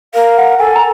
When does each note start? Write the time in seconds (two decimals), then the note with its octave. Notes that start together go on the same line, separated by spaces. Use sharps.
0.14 A#4 F5
0.37 F#5
0.59 A4 G#5
0.75 A#5